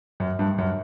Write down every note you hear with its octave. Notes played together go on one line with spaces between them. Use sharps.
F#2
G2
F#2